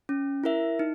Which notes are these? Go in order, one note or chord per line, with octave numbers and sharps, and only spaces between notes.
C#4
E4 A#4 E5
D#4